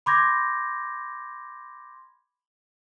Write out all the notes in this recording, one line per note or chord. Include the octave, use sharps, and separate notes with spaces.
B5 C6 D6 G6 G#6 A#6